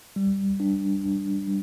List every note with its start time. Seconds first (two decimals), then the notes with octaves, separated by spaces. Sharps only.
0.16 G3
0.60 D4
1.04 D4
1.47 G3